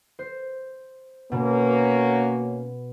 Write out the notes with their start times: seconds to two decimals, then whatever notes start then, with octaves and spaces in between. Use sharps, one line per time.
0.19 C5
1.32 B2 A#3 C#4 F#4